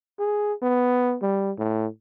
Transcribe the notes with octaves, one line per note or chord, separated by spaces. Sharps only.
G#4
B3
G3
A2